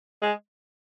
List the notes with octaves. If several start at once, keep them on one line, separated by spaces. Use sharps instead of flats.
G#3